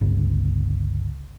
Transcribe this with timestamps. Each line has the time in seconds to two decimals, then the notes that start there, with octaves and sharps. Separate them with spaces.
0.01 G1 C#2